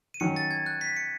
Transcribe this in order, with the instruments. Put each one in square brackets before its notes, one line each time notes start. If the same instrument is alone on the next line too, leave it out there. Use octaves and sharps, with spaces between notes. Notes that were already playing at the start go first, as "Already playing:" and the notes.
[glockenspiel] D#7
[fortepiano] D#3 F#3 C#4 [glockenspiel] C#7
[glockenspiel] A6
G#6
F#6
B6
C#7